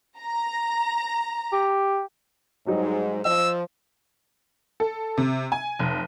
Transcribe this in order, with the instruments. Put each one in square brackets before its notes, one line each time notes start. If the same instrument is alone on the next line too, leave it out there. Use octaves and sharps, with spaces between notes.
[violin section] A#5
[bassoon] G4
[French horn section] G#2 [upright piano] F#3 G3 D#4
[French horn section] F3 C5 [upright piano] D#5 [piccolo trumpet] E6
[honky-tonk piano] A4
C3
G#5
F1